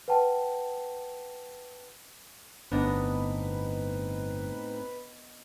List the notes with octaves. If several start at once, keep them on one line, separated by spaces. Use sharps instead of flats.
B4 F#5 G5 A5
G1 A2 B3 C4 D4 D#4 B4 D#5